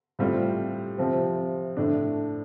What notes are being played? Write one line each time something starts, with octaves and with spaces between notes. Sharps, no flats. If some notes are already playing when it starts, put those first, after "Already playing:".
A2 G3 C4 F4
C3 F3 C4
A2 A3 D4